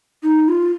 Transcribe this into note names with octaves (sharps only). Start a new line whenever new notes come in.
D#4
F4